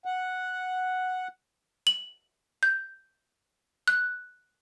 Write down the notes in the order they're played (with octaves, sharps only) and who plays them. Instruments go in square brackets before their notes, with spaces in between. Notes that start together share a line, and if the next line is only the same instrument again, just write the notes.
[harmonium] F#5
[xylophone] F#7
G6
F#6